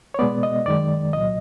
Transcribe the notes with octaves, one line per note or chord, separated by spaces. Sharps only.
C#5
B2 G#3 B3 D5
D#5
F#2 D#3 G#3 D5
C2 A#2 F#3 D#5